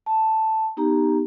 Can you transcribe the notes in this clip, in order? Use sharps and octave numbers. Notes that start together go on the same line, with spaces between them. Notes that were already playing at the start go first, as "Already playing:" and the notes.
A5
B3 D#4 G4 A#5